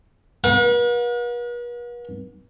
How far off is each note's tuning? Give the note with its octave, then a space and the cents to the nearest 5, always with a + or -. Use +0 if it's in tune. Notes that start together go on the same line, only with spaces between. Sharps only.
B4 -45 F#5 -45